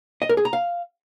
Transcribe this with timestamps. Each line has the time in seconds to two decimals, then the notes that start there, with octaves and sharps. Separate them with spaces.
0.22 D#5
0.29 A#4
0.37 G#4
0.45 A#5
0.53 F5